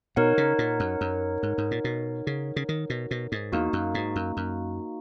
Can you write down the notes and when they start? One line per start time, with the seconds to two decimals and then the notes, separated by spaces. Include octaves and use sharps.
0.16 B2 D#4 A#4 C#5 F#5
0.38 C#3
0.59 A#2
0.80 F#2
1.01 F#2
1.43 G#2
1.58 G#2
1.71 A#2
1.84 B2
2.27 C#3
2.56 C#3
2.69 D#3
2.90 B2
3.11 B2
3.32 G#2
3.52 E2 A#3 D#4 F#4
3.73 F#2
3.95 G#2
4.16 F#2
4.37 F#2